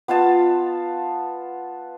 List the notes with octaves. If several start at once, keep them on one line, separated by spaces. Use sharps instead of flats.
B3 F4 F5 A5